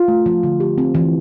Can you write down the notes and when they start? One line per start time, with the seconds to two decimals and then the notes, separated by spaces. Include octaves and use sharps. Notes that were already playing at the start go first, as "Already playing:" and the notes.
Already playing: F4
0.08 A3
0.26 F3
0.43 D3
0.60 G4
0.78 C4
0.95 E3